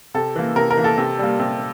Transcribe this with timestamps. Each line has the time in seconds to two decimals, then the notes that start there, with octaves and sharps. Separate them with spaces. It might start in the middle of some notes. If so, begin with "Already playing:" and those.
0.14 C3 A4
0.36 E3 A#3
0.56 C3 A#4
0.71 A#4
0.77 E3 A#3
0.84 A4
0.98 C3
1.19 G3 A#3
1.39 C3